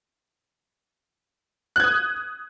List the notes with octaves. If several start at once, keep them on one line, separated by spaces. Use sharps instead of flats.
D#6 F#6 G#6